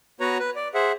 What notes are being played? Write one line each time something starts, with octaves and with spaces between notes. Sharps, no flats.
B3 F#4 B4 C#5 A#5
B4
D5
G#4 C5 E5 F#5